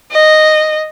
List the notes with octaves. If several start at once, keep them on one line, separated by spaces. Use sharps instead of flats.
D#5